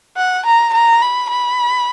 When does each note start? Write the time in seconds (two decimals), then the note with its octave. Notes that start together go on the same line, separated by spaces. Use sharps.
0.17 F#5
0.46 A#5
0.74 A#5
1.03 B5
1.30 B5